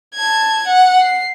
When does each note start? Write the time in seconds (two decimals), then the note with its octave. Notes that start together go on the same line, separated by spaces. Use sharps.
0.15 A5 G#6
0.67 F#5
1.00 C7